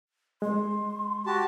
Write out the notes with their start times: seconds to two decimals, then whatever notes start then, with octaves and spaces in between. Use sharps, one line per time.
0.42 G#3 C6
1.26 F#4 G4 A5